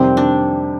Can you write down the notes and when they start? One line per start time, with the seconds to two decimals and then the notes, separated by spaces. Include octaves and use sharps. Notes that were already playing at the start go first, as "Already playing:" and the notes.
Already playing: F2 C3 D#3 G3 C4
0.17 D4